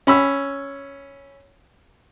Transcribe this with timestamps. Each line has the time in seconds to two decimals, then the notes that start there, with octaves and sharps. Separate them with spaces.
0.07 C#4 B5 E6